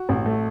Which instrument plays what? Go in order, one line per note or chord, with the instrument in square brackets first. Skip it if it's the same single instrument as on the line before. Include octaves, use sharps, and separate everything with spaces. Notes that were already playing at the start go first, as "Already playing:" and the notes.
Already playing: [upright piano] F#4
A1
A3